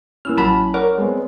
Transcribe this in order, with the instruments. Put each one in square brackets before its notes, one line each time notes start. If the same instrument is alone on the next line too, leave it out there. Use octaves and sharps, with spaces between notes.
[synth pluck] A#3 E6 F6 [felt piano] C#4 E4
[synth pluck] A1 F#3 F#5 [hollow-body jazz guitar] A5 B5
[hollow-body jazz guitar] A#4 [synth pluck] C#5 D5 F#5
[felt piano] G#3 B3 C4